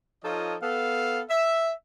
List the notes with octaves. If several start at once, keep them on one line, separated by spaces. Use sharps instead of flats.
F3 D#4 F4 A4 C#5 D#5
B3 A4 F5
E5